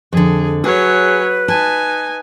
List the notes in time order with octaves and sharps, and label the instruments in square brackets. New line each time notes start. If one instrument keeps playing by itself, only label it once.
[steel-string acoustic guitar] F2 D3 [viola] G#4
[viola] F#3 C#5 [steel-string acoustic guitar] G#4 [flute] B4
[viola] D#4 G#5 [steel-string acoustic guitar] A5